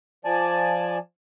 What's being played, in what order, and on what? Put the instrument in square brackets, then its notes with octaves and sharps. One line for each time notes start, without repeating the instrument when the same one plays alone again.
[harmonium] F3 D5 G#5 A5